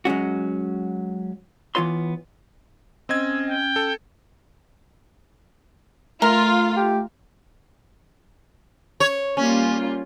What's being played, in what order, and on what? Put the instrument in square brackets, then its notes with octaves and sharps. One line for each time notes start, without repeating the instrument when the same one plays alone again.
[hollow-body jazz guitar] F#3 G#3 C#4 F#4
E3 B3 F4 C#5 C6
[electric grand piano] C4 D#5 G#6 [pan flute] C#4 [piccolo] E6
[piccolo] G5
[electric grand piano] A4
[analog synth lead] A3 [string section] F4 [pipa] A#4
[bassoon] G4
[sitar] C#5
[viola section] G3 A#3 F4 [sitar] C#4